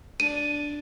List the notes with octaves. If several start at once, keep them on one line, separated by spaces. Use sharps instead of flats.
D4 D#7